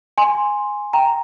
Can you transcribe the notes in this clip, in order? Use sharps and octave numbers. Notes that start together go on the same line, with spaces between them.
G#5 C6
G5 A#5